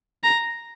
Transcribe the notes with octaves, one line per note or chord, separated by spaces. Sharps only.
A#5